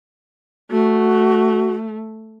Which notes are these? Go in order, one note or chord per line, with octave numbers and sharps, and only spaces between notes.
A3 F#4